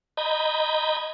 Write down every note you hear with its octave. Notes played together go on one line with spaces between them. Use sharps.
D#5 A#5 B5 G6 G#6